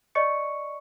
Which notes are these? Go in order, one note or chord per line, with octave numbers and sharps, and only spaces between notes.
D5 D#5 C#6 C#7